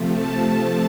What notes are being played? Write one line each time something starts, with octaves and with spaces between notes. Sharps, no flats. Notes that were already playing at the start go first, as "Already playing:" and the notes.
Already playing: C3 F3 A3
A5